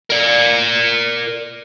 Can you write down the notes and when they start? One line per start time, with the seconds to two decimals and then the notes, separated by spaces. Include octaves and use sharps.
0.10 A#4 D5